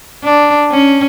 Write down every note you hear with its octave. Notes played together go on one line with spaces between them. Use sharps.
D4
C#4